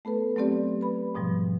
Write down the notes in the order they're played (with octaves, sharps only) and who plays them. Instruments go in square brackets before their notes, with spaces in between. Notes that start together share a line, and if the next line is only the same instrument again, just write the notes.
[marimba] A3 B3 A4 B4
F#3 A3 B3 C4 G4 D5
B4 B5
G#2 B2 F3 G3